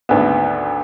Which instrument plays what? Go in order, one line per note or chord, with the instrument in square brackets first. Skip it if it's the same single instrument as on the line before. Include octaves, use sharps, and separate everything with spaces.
[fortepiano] G#1 D2 B3